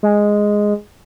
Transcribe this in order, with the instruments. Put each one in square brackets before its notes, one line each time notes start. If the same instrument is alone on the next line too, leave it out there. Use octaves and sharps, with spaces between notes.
[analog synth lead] G#3